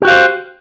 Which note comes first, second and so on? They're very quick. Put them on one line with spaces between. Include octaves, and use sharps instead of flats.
G4 F#4 F5 C5